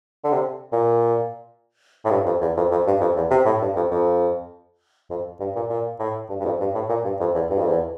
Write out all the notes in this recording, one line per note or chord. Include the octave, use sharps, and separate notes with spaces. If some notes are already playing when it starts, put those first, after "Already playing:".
D3
C3
A#2
A2
G2
F2
E2
F2
F2
G2
F2
E2
C3
A2
G2
F2
F2
F2
G2
A#2
A#2
A2
G2
G2
F2
G2
A2
A#2
G2
F2
E2
G2
F2
E2